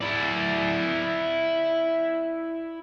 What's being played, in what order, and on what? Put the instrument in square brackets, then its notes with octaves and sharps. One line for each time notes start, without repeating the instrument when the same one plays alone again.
[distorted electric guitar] E4 D5